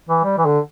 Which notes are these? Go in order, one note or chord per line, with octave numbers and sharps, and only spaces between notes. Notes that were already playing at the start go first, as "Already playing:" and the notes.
E3
G3
E3
D3